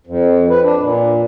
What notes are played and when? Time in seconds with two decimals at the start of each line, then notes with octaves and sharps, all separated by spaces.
0.07 F2
0.50 B4
0.63 D4
0.80 A#2